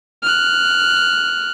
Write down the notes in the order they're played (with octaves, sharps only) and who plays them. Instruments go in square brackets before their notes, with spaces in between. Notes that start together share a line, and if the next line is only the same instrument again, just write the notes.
[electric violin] F6 F#6